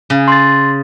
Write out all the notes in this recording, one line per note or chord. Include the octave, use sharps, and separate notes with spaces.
C#3
C6 A6